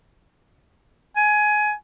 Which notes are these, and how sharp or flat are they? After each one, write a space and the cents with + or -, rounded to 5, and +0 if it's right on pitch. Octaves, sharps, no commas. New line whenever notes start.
G#5 +20